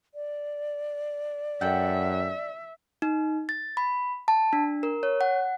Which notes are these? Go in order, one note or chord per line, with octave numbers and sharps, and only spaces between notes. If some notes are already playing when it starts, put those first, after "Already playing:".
D5
F#2 A4 E5 F#5 G5
D#4
A6
B5
A5
D4
A#4
C#5
F#5